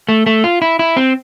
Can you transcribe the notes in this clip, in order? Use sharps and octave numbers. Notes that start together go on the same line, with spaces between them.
A3
A3
F4
E4
E4
C4